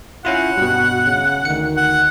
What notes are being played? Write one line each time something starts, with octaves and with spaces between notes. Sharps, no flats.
C#4 E4 F4 F#5
G2 B2 F#4
C#3
D2 D#3 C#7
F#5